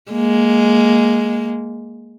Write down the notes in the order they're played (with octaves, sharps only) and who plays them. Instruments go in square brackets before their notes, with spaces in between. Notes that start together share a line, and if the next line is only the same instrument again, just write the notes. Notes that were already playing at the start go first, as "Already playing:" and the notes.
[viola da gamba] G#3 A#3